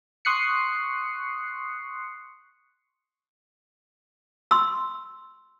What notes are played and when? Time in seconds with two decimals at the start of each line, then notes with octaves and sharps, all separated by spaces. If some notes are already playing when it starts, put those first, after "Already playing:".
0.25 C6 C#6 D#6 F#6 C7 C#7
4.51 C6 E6